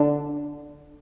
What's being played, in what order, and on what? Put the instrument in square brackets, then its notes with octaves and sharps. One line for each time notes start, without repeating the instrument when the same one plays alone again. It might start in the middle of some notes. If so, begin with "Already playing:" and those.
Already playing: [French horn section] D3 D4